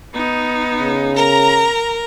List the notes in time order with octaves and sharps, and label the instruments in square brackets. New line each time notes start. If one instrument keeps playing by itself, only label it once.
[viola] B3 D#4
[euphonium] C#3
[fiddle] A#4 [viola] A#5